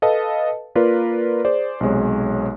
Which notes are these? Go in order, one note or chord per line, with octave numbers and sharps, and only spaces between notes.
A4 B4 D#5 F5 A5
A#3 F4 A#4 B4 D5
G#4 C5 D5
B1 C3 G#3 C#5